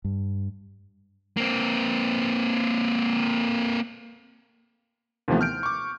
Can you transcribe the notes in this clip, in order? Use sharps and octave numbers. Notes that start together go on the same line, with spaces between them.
G2
A#3 C4
D#2 C3 E3 F3 A3 B3
F6 G6 D7
C#6 D6